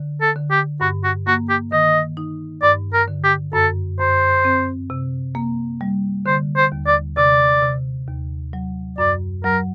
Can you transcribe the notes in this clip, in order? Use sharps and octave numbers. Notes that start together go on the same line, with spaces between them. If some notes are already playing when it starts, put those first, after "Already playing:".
Already playing: D3
A4
D3
G4
G2 F#4
F#4
A#3 F#4
G4
D#3 D#5
D#4
G2 D5
A#4
D3
G4
F#2 A4
F#2 C5
C4
C3
A#3
G3
D3 C5
C5
D#2
D5
C3 D5
C3
D#2
F#3
F#2 D5
F#3 A#4